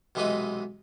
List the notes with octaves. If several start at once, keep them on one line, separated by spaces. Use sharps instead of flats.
B1 C3 E3 G#3 D#4 B4